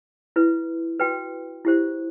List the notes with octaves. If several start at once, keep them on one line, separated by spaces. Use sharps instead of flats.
E4 B4
F#4 B4 G5
E4 G4 C5